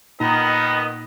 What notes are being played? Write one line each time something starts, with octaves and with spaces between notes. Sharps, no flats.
A#2 D#3 B3 D#4 D#5 A#5